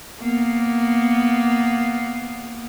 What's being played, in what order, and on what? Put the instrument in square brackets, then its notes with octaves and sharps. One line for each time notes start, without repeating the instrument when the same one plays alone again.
[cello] A#3 B3